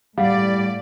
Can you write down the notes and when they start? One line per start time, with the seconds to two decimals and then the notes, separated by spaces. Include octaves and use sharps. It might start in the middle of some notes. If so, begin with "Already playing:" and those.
0.18 A2 G3 D5 F5 F#5